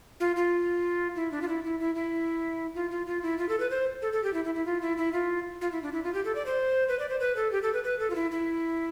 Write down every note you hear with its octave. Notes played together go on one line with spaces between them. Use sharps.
F4
F4
E4
D4
F4
E4
E4
E4
E4
F4
F4
F4
E4
F4
A4
B4
C5
A4
A4
G4
E4
E4
E4
F4
E4
E4
F4
F4
E4
D4
E4
F4
G4
A4
D5
C5
B4
D5
C5
B4
A4
G4
A4
B4
B4
A4
F4
E4
E4